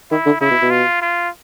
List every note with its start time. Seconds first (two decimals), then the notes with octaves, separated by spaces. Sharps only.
0.11 D#3 E4
0.26 D3
0.41 C#3 E4
0.51 B2
0.62 B2
0.71 F4
1.02 F4